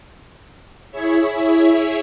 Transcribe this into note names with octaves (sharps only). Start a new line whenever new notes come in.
E4 G#4 C#5 E5